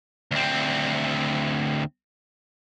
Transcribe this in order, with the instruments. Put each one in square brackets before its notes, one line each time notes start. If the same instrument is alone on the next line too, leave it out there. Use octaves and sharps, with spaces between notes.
[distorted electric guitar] D2 C4